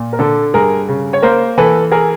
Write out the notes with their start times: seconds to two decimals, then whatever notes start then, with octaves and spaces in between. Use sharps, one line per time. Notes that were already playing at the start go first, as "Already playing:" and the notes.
Already playing: A#2
0.13 A#4
0.19 D3 A4
0.54 G2 G#4 A#4
0.89 C#3
1.13 C#5
1.22 A#3 A#4 C5
1.58 E3 A4 B4
1.92 G#4 A#4